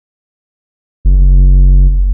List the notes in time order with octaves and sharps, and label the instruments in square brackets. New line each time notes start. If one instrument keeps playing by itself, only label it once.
[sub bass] F#1